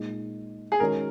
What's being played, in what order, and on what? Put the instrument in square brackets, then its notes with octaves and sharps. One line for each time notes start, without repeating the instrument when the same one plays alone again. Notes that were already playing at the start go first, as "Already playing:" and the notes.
Already playing: [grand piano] A#2 G#3 D#4
[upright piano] G#4
[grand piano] D#3 G#3 C#4 F#4 C#5 [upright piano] A#4